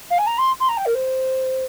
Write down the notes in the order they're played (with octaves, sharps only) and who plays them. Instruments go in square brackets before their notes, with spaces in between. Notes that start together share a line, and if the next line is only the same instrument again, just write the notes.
[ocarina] F5
G#5
A#5
C6
C6
A#5
G5
A#4
C5